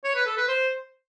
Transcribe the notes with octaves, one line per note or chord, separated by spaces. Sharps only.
C#5
B4
A4
B4
C5